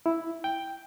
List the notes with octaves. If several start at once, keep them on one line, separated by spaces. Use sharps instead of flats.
E4
G5